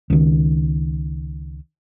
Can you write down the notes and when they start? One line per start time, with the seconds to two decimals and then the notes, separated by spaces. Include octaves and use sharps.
0.10 C#2 D#3